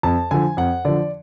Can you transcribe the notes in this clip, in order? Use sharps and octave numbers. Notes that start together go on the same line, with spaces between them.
F2 A5
D3 F3 G#5
F2 F#5
D3 F3 D5